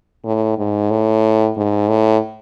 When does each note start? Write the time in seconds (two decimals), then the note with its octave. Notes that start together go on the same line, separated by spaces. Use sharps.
0.25 A2
0.58 G#2
0.91 A2
1.56 G#2
1.89 A2